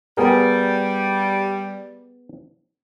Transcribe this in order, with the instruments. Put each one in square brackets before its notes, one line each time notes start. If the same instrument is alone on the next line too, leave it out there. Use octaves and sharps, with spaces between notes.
[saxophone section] G3 [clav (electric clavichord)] B3 G#4 A#4